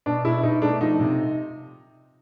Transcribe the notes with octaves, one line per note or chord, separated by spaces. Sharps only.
B2 D4
B2 E4
B2 D#4
A3 D4
F3 D#4
C3